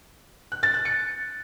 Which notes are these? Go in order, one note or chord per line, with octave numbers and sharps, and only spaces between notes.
F#6
A6
F#6
C#7